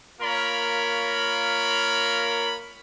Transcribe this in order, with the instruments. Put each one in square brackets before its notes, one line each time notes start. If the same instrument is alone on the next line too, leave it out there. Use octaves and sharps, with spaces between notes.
[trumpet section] A#3 F4 A#4 C#5 B5